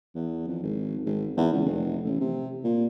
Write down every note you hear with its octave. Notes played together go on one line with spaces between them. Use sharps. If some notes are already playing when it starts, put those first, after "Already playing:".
E2
F2
G#1
G#1
E2
C#2
F1
A1
C3
A#2